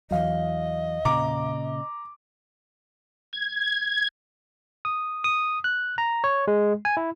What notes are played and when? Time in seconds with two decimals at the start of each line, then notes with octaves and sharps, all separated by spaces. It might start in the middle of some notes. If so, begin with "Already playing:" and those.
0.11 E2 E3 F#3 D#5 F5
1.05 A#2 C#3 A#5 D6
3.33 G#6
4.85 D#6
5.24 D#6
5.64 F#6
5.98 A#5
6.24 C#5
6.48 G#3
6.85 G#5
6.97 E4